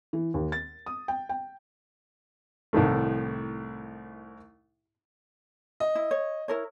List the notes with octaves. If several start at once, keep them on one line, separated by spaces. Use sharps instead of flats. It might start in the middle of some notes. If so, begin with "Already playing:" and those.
E3
D#2
A6
D#6
G5
G5
C2 A2 D#3 A3
D#5
E4
C#5
E4 A#4 C#5